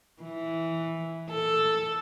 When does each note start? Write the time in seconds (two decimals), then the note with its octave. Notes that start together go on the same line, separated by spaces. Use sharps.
0.23 E3
1.30 A4